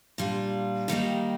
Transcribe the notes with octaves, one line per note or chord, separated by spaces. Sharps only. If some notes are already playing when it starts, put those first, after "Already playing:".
A#2 G3 D4 F4
D#3 G3 A#3 D#4